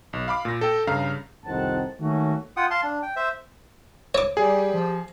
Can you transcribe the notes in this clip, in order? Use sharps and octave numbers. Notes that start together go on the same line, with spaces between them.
B1
F5 B5 D6
A#2 A#6
A4 G5
G2 C#3 F5 A#5
C2 F2 D#3 C4 F#5 A5
D#3 F#3 A3 A#3 C#4 F#4
F4 F#5 G5 D#6
F5 A5 C6
D4
G5
C5 E5
C#5 D6
G3 G4 G#4
F3